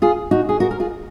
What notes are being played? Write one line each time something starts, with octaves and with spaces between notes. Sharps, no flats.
F4 G#4
D#4 F#4
G#4
F#4 A#4
A#4
F4 G#4